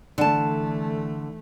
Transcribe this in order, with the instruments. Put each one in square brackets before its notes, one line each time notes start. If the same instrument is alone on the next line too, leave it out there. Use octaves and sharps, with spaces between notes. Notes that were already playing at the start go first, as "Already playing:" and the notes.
[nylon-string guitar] D3 A5 [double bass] E3 A3